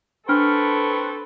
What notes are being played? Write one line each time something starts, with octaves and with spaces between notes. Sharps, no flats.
D4 A4 B4 C5 G5 C#6 F6